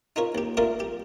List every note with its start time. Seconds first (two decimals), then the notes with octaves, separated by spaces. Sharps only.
0.16 D#4 F4 A#4 C#5
0.35 D#2 G4
0.57 A3 A#3 D4 F4 A#4
0.80 G4